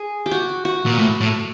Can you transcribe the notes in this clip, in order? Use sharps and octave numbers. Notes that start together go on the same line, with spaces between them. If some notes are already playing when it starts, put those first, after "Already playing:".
Already playing: G#4
G4
F#4
F#4
A#2
A2
A2